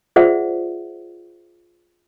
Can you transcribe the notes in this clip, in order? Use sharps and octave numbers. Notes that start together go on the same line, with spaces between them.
F4 G#4 C5 D5 E5 F#5